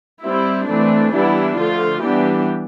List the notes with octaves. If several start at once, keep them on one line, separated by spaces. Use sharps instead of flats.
G3 C4 E4
E3 A3 C4 D4
E3 G3 B3 D4 E4
D3 F3 A3 F4
E3 G3 B3 D4 G4